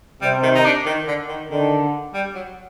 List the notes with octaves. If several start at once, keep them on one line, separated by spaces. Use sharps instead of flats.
C3 G3
D#3
D#4
D4
D#3
D3
D#3
D3 D#3
G3
F#3